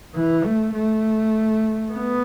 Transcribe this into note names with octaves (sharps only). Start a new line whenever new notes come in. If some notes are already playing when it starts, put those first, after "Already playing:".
E3
A3
A3
B3